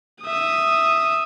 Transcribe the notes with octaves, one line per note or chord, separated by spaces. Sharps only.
E5 D#6